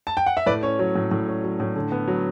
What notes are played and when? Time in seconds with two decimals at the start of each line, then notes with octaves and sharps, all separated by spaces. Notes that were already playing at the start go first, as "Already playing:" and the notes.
0.07 A5
0.17 G5
0.26 F#5
0.37 E5
0.46 A2 B4 D5
0.63 C#4 C#5
0.79 F#3 C#5
0.96 A2
1.11 A2
1.28 C#4
1.43 F#3
1.60 A2
1.75 D3
1.92 B3
2.08 F#3